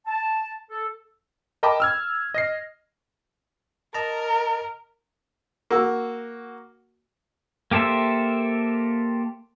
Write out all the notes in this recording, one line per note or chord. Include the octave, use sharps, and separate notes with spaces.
A5
A4
A#4 D#5 G5 A5 B5 D6
E6 F6 G#6
D#5 A#6 C7
A#4 D#5 A5 A#5
A#3 F#4 E6
A#3 G4 A4 C5 E5